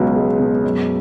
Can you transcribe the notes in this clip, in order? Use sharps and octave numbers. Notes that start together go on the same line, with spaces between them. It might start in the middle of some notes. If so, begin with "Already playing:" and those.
Already playing: C#2 B2 F#3
G#3
B2
F#2